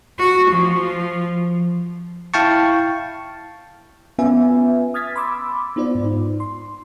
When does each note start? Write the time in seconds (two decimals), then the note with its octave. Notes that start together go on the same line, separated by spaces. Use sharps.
0.19 F#4
0.49 F3
2.34 E4 F5 G5 A5 C#6
4.19 B3 C#4 F4 B4 E5 G#5
4.94 D#6 F6 G#6 A6 B6
5.16 B5 C6 D6 E6
5.76 B3 D#4 F4 C5 D5
5.95 G#2
6.40 C6